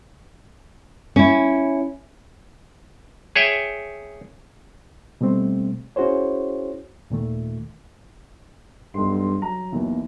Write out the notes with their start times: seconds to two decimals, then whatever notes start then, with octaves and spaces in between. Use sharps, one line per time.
1.16 C#4 E4
3.36 G#4 C#5 E5 G5
5.21 B2 G3 A3 C4
5.96 C#4 E4 F#4 G#4 C5 C#5
7.10 D#2 A#2 D#3 A3
8.94 B1 G2 C6
9.42 F#3 A#5
9.72 D#2 B2 E3